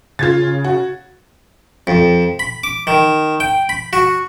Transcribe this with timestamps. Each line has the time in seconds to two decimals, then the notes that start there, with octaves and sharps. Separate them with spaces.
0.19 C#3 F4 G#6 A6
0.64 F#4
1.87 F2
2.39 B5
2.64 D6
2.87 D#3
3.40 G5
3.69 B5
3.93 F#4